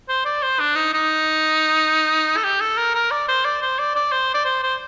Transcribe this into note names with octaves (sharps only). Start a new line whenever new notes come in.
C5
D5
C5
D4
D#4
D#4
A4
G4
A4
A#4
A#4
D5
C5
D5
C5
D5
D5
C5
D5
C5
C5